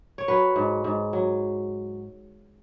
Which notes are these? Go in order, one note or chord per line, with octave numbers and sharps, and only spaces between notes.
C#5
F#3 B4
G#2
G#2
F#3